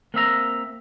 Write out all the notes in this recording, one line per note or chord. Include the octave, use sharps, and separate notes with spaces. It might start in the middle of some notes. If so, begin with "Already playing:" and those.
A#3 C4 E5 A#5